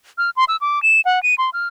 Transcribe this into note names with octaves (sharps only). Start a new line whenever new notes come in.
F6
C6
E6
D6
E7
F#5
D#7
C6
F6